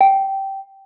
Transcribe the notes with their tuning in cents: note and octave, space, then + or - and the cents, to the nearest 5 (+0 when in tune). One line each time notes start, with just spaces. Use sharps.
G5 -10